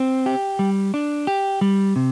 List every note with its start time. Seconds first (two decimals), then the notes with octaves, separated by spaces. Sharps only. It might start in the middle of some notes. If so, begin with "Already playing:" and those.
Already playing: C4
0.26 G4
0.59 G3
0.94 D4
1.27 G4
1.61 G3
1.96 C3